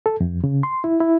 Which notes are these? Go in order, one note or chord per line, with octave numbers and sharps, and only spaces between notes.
A4
F2
C#3
C6
E4
E4